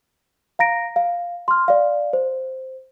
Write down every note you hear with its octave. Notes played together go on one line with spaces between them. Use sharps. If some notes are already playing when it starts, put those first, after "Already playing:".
F5 A#5 A#6 D7
F5
C6 F6
D5 F5
C5